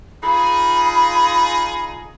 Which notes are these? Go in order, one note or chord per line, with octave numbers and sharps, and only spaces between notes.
D#4 F4 G#4 B5